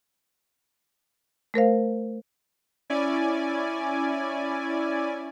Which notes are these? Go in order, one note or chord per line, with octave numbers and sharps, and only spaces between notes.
A3 A#4 C5 F5
C#4 E4 D5 G#5